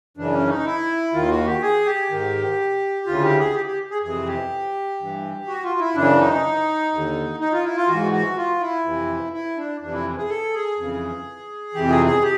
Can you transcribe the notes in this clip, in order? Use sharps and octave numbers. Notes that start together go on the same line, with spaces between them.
F#2 C#3 E3 D4
C#4
D4
D#4
E4
D#2 D#3 F4
F#4
G4
G#4
G4
G#2 D#3
D2 C#3 E3 F4
G4
G#4
G4
G4
G#4
F2 C3 E3 G#4
G4
G2 E3
F#4
F4
E4
F#2 C#3 E3 D4
D#4
D#2 D3
D#4
F4
E4
F4
G#2 E3 F#4
F#4
F4
E4
F2 C3 E3
E4
D4
F2 C3 E3 D4
E4
G#4
A4
G#4
F2 C#3 E3
F2 C3 E3 G4
G#4
G#4
G4